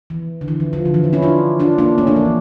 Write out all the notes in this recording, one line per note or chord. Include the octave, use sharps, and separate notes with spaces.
E3
D3
E3
F3
F3
D3
E3
F3
C#4 E4
D4 F4
D4 F4
A#3 D4
A3 C#4
A#3 D4
F3
E3